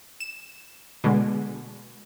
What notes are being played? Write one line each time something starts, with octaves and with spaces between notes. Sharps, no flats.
E7
B2 D3 G#3